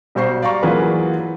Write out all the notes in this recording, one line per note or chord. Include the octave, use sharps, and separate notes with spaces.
B1 G3 F#4 C5 C#6 C7
D5 F5 A#5 C#6
E3 F#3 A#3 F4 G#4 B4